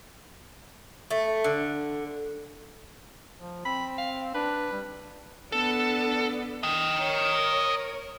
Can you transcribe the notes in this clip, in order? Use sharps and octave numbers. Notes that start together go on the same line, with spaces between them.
A3
D3
F3
C4 B5
F5
D4 B4
G3
B3 D4 A4
D#5 G5
A#4 C#5